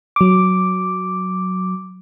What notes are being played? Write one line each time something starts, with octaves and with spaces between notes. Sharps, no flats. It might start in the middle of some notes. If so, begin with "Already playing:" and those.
F#3 D6